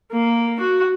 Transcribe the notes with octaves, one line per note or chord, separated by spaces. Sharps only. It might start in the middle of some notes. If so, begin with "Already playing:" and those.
A#3
F#4